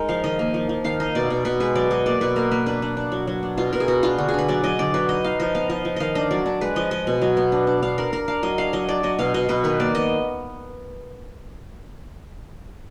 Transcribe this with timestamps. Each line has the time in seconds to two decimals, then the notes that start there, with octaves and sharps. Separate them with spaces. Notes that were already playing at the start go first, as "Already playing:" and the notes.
Already playing: G#3 D#4 A#4
0.09 F3 F5
0.24 D#3 D#5
0.39 A#3
0.54 F3
0.69 F3
0.84 D#3 F5
1.00 D#4 D#5
1.15 B2 D5
1.30 B2
1.45 B2 B4
1.60 G#3 B4
1.75 F#3 D5
1.91 F#3 D#5
2.06 A#3 D5
2.21 B2 B4
2.36 A#3 A#4
2.51 A#3 B4
2.66 D4 B4
2.82 D4
2.97 D4
3.12 F#3
3.27 F#3
3.43 D4
3.57 B2 F4
3.73 B2 A#4
3.80 G#4
3.88 B3 F#4
4.03 D4 F4
4.18 D3 F#4
4.28 G#4
4.34 D3 B4
4.48 F#3 D5
4.64 F#3 D#5
4.79 D3 D5
4.94 F#3 B4
5.09 D#4 D#5
5.24 D#4 F5
5.40 F3 D#5
5.55 B3 F5
5.70 F3 D#5
5.85 F3
5.96 D#3 D#5 F5
6.15 D4 D#5
6.31 F#3 D5
6.46 D4
6.61 G#3 B4
6.76 F3 D#5
6.91 G#3 D#5
7.07 B2
7.22 F#3
7.37 B3
7.52 D4
7.67 D4
7.83 D4 F5
7.98 D4 A#4
8.12 D4 A#4
8.28 D4 F5
8.43 F#3 D#5
8.58 D4 F5
8.73 F#3 D#5
8.88 D4 D5
9.03 F#3 D#5
9.19 B2 F5
9.34 B2 D#5
9.49 B2 B4
9.64 D#3 B4
9.80 A#3 D5
9.95 B3 D#5